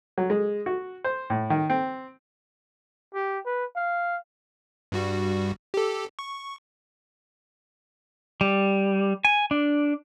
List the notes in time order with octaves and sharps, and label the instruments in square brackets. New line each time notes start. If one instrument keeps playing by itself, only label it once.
[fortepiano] F#3
G#3
F#4
C5
A2
D#3
C4
[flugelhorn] G4
B4
F5
[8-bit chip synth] G2 G3 F#4
G4 A4
C#6
[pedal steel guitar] G3
G#5
D4